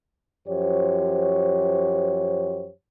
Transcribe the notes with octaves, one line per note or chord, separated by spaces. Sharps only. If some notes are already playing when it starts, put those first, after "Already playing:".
F#2 F3 G4 C5 C#5